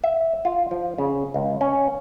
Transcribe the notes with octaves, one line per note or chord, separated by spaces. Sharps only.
E5
F4
F3
C#3
C#2
C#4